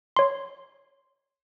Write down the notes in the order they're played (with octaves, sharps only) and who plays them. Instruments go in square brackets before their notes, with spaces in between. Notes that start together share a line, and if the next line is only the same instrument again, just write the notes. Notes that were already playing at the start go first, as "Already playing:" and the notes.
[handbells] C#5 C6